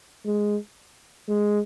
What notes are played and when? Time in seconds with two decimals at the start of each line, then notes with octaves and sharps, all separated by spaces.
0.26 G#3
1.29 G#3